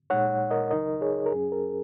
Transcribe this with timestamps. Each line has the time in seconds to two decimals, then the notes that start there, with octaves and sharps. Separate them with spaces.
0.10 A#2 G#3 D#4 C#5 F#5
0.51 A#4 D#5
0.71 C#2 C#3 F#3 D#4 A#4 D#5
1.01 G#4 C#5
1.26 A#4
1.32 F#2 F#3 C#4 G#4
1.52 A#4